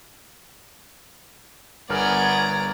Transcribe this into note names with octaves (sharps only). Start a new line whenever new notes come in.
G1 B3 G#4 A#4 D5 A#5 F6